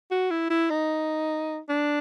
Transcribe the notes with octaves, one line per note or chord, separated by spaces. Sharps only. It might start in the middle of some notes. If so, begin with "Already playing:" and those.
F#4
E4
E4
D#4
D4